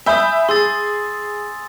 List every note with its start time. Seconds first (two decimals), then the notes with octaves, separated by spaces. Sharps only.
0.06 E5 G#5 B5 D#6 G6
0.49 G#4 C6 E6 A6